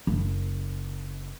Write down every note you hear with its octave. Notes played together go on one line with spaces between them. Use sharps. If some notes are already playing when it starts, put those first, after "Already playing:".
F#1